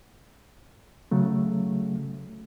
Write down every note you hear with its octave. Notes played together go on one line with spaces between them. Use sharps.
C#3 F#3 A3